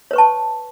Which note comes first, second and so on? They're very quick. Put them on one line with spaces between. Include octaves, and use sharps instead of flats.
C#5 B4 C#6 A5